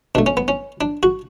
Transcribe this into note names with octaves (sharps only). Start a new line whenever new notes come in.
B2 A3 D4
C#4
B3
C#4
D4
F#4